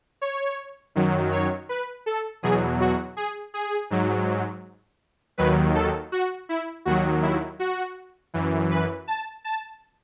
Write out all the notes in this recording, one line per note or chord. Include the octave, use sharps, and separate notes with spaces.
C#5
F#2 D#3 F#3
C#5
B4
A4
E2 B2 F#3 G#4
F#4
G#4
G#4
G#2 F#3
D#2 D#3 F#3 B4
A4
F#4
E4
D#2 D#3 F#3 F#4
E4
F#4
F#2 E3
B4
A5
A5